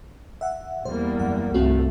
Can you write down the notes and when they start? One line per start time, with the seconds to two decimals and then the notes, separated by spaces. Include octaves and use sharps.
0.41 E5 F#5
0.85 E2 G3 A#3 C5
1.19 F#2 F#5
1.54 G1 C2 A3 C4 F4 F#4